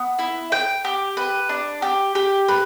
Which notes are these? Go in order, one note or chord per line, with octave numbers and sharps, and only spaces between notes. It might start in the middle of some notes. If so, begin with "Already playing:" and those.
Already playing: B3
E4
G5
G4
B4
D4
G4
G4
B4